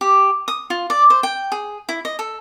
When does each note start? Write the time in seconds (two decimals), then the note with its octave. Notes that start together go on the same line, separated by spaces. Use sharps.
0.01 G4
0.48 D#6
0.70 F4
0.90 D5
1.10 C5
1.23 G5
1.52 G#4
1.89 E4
2.05 D#5
2.19 A4